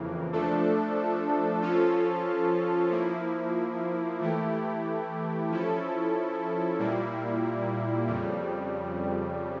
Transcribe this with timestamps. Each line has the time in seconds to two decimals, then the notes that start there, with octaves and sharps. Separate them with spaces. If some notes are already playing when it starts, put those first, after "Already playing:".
Already playing: F2 C#3 E3 A#3
0.33 F3 A3 D4 A4
1.62 F3 C#4 F4 A4
2.91 F3 A#3 E4
4.20 E3 A3 E4 G4
5.50 F3 C#4 E4 A4
6.79 A#2 G3 A#3 E4
8.08 F2 C#3 G3